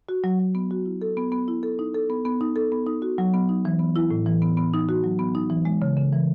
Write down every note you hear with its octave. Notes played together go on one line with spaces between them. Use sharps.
F#4
F#3
F#3
B3
F#4
E4
A4
B3
B3
E4
A4
D#4
A4
B3
B3
D#4
A4
B3
D#4
F#4
F#3
B3
D#4
E3
B3
E4
A2
E3
B3
B3
D#4
F#4
F#3
B3
D#4
E3
G#3
C#3
C#3
E3